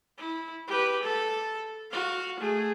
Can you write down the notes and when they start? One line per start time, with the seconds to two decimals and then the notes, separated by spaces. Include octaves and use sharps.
0.18 E4
0.68 G4 B4
1.03 A4
1.91 F#4 F5
2.40 A3 G#4